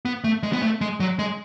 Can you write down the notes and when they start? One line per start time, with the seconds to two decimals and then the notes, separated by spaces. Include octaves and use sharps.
0.05 B3
0.24 A3
0.43 G#3
0.53 B3
0.62 A3
0.81 G#3
1.00 F#3
1.19 G#3